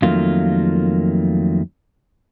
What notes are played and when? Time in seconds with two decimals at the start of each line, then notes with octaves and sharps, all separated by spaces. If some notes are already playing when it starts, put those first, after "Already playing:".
0.02 F2 D#3 F#3 A3 A#3 F4